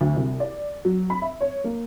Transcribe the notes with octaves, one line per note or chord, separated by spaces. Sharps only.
D2
C2
D5
F#3
B5
E5
C#5
A#3